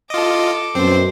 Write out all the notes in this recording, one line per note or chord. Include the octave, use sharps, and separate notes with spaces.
F4 A4 D#5 D6
F#2 B2 C4 C5